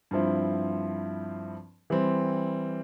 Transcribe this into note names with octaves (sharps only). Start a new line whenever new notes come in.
G2 F3 C4 E4
E3 G3 C4